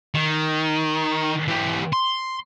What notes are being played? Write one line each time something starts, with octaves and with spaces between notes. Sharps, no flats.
D#3
E3 G4
C6